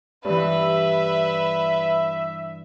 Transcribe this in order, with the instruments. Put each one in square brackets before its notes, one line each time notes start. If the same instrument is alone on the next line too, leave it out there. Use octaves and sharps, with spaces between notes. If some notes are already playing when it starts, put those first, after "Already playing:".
[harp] G2 E3 [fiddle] B4 [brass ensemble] E5